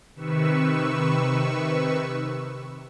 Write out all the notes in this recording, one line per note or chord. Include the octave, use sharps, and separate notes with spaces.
C3 D#3 B4 C#6 E6